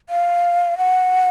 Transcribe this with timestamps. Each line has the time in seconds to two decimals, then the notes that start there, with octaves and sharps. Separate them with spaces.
0.09 F5
0.78 F#5